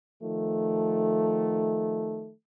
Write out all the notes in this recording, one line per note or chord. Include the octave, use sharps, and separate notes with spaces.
D#3 F3 A3